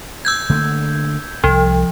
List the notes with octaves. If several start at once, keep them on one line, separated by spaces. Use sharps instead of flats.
E6 G6 G#6
D3 A3 A#3
C2 F3